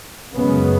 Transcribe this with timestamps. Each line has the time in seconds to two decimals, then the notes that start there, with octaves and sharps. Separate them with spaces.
0.35 F#2 C#3 G#3 B3